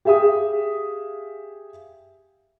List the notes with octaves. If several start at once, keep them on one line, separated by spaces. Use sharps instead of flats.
G4 G#4 E5 F5 D#6